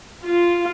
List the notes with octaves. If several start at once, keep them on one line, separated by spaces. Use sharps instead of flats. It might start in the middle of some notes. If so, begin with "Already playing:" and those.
F4